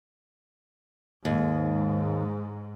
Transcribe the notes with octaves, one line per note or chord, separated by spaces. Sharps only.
D#2 G#2